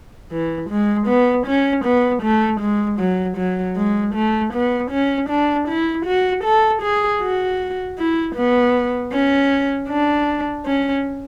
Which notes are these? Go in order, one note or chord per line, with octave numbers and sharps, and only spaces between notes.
E3
G#3
B3
C#4
B3
A3
G#3
F#3
F#3
G#3
A3
B3
C#4
D4
E4
F#4
A4
G#4
F#4
E4
B3
C#4
D4
C#4